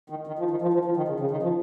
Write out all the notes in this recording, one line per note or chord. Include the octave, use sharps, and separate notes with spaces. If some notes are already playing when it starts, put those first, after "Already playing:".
D#3
D#3
F3
D#3
F3
F3
F3
D#3
C#3
C#3
D#3
F3